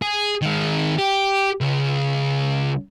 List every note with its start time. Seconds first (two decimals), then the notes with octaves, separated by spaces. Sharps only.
0.02 G#4
0.42 D#3 G#3
0.98 G4
1.61 C#2 C#3